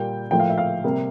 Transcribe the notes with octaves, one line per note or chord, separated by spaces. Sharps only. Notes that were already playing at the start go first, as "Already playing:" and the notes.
Already playing: A#2 G3 A#3 G5
A2 F3 A#3 G5
F5
E5
F5
C3 G3 A#3